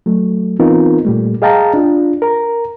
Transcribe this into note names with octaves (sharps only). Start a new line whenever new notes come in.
F#3 A3
E3 B3 C4 D#4 F4 A#4
A#2 G3 A3
G#4 D#5 F5 G5 A5 A#5
D4 F4
A#4 A#5